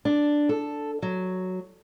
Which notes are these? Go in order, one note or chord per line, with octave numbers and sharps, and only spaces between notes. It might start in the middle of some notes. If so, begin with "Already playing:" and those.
D4
A4
F#3